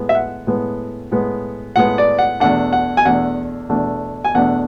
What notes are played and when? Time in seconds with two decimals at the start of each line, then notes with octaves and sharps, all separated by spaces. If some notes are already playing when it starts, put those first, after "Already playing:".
Already playing: A2 G#3 B3
0.09 E5
0.15 F#5
0.47 A2 G#3 B3
1.11 A2 G#3 B3
1.76 A2 G#3 B3 F#5
1.98 D5
2.19 F#5
2.40 E2 B2 A3 D4 F#5
2.73 F#5
2.97 G#5
3.05 E2 B2 A3 D4 F#5
3.69 E2 B2 A3 D4
4.25 G#5
4.34 E2 B2 A3 D4 F#5